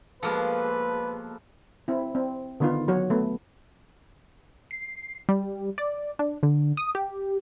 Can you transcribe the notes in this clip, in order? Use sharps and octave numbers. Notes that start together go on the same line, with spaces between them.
B2 F3 G#3 A#3 A4 B4
C4 E4
C4
D3 D#3 B3 D#4 F4
F#3 F#4 C#5
A3 B3
C7
G3
D5
D4
D3
D#6
G4